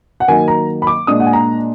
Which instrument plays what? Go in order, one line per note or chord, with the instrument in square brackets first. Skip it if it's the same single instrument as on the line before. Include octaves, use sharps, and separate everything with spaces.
[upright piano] F#5
D#3 F#3 A#3 G#5
A#5
B5
D6
A#2 G#3 D4 D#6
F#5
G#5
A#5